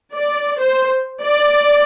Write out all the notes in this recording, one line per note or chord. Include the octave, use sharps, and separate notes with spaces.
D5
C5
D5